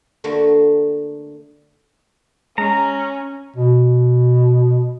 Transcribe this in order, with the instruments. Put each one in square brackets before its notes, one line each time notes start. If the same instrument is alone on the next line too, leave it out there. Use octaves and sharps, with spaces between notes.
[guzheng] D3 A3 A#3 F#4
[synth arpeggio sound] G#3 [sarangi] C#4 [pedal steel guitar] A#5
[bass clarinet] B2